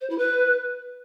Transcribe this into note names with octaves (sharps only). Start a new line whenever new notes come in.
C5
E4
B4